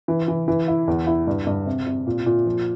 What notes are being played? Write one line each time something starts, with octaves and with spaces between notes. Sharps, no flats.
E3
E3
E3
E4
E2
E4
G2
G2
C3
C3
A#2
A#2
F3